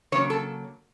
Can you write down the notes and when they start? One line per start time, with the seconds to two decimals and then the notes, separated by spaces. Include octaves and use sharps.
0.12 C#3 F#3 A#3 C#5
0.30 A4